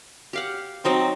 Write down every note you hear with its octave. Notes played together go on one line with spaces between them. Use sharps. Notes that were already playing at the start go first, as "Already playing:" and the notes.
G4 F5 F#5
F#3 C4 D#4 D#5